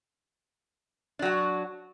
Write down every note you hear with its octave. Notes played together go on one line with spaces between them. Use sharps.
F#3 D4 F#4